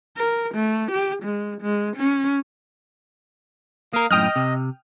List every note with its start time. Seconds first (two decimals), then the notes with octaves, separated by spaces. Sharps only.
0.17 A#4
0.55 A3
0.92 G4
1.23 G#3
1.61 G#3
1.97 C#4
3.93 A#3 A#4 F5 D#6
4.11 F#2 A2 D#5 G5 D#6 F6
4.36 C3